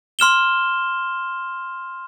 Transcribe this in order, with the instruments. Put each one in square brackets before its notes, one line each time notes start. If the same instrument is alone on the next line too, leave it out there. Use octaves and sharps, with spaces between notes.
[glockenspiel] C6 F6 E7 G7